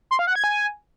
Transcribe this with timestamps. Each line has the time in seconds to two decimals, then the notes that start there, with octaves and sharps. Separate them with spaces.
0.11 C6
0.19 F5
0.27 F#5
0.35 G#6
0.44 G#5